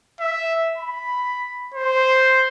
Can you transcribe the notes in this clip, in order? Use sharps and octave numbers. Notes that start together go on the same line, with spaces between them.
E5
B5
C5